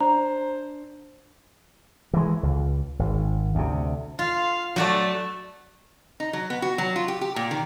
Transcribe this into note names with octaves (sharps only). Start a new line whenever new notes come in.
D4 C5 A#5
E3 G#3
C#2
G#1
D2 C3
F4 F5
F#3 A3 F#4 D5
D#4
F#3
B3
F#4
F#3
F4
G4
G4
A#2
D#3